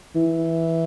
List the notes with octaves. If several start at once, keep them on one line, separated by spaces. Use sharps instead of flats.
E3